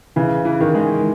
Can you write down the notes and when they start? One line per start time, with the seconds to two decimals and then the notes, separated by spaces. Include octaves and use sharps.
0.16 C#3 E3
0.45 E3
0.60 D#3
0.75 G#3